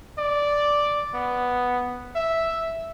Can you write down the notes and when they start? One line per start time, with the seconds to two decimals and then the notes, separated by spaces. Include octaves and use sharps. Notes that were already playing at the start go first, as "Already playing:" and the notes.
0.18 D5
1.14 B3
2.16 E5